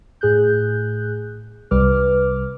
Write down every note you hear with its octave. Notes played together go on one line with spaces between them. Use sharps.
A2 G#4 F#6 G6
C2 C3 G3 B4 D6 F6